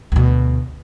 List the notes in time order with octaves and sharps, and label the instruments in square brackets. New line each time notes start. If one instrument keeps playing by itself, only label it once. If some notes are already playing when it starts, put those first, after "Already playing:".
[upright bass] D2 B2